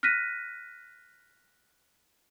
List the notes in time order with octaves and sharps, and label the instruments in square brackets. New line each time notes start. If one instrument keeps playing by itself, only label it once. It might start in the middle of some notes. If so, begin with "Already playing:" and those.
[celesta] F6 F#6 A#6 B6 D#7